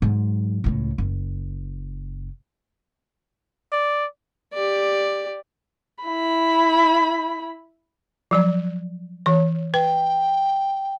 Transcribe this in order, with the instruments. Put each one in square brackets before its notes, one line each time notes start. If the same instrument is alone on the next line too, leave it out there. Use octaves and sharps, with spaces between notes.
[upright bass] G#2 F#3
C#2 A2
F#1
[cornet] D5
[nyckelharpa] G4 D5
[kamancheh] E4 B5
[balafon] F3 F#3 D5
E3 C#5
[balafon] B4 [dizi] G5